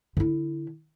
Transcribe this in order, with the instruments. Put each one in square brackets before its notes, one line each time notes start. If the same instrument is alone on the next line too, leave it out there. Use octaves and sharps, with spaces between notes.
[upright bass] D3 E4